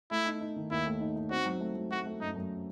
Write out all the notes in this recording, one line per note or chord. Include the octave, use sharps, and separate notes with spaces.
A3 E4
D#4
D#4
D#3
D#2 E4
A3
D#4
D#4
C4 F#4
F#3
A3
F#3
A3 F#4
A3
F#2 D#4
F#2